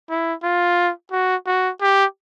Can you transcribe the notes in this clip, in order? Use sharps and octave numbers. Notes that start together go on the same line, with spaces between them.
E4
F4
F#4
F#4
G4